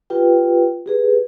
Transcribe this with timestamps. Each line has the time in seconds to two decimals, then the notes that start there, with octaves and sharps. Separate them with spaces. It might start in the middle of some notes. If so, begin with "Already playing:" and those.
0.10 F4 G4 B4 G5
0.86 G4 G#4 B4